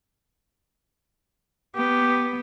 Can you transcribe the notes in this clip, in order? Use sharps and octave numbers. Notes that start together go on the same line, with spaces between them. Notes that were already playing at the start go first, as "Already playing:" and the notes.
B3 G4